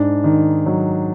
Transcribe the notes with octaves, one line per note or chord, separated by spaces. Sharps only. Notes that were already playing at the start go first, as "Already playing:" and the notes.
Already playing: G#2 D4
D#3
F#3